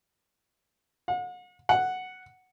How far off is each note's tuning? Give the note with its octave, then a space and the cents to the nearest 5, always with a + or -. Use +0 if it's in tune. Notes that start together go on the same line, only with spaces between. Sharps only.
F#5 -40
F#5 +0